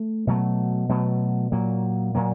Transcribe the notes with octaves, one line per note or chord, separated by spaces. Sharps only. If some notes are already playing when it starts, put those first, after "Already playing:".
Already playing: A3
B2 F#3 A3
B2 F#3 A3
A#2 F#3 A#3
A#2 F#3 A#3